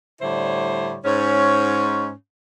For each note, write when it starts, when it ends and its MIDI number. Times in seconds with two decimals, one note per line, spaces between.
0.21 0.98 45
0.21 0.98 50
0.21 0.98 55
0.21 0.98 64
0.21 0.98 72
0.21 0.98 73
1.05 2.11 44
1.05 2.11 61
1.05 2.11 73